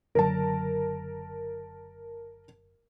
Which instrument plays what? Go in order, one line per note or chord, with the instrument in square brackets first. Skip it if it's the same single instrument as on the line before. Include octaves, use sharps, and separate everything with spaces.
[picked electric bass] F#1 D3 F#3 [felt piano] A#4 A5